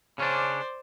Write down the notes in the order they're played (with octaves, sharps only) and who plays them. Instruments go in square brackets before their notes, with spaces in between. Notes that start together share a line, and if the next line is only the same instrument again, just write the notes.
[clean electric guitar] C#3 C#4 D4 [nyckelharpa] C5 D5